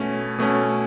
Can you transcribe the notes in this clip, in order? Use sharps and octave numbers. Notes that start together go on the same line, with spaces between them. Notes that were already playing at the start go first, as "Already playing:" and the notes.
Already playing: B2 A3 C#4
B2 A3 C#4